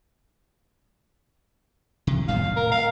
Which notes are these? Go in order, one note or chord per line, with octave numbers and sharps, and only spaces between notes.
C3
A2 G3 B3 F5
A2
A#4
F5